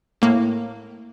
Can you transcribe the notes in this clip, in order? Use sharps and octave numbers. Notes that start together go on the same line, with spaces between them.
A2 A#3